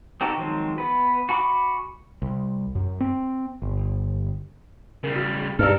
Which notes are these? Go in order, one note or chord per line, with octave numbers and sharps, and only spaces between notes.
C4 D#4 F#4 G4 A4
D#3 F3 F#3 G#3 C4
B3 B4
F#4 G#5 B5 C#6 D6
C2
F#2
C4
G1
C#3 G3 A#4
F#4
G2 A4 A#4 E6 F6